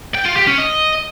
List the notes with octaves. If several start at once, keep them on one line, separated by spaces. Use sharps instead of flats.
G5
F4
G4
C#4
D#5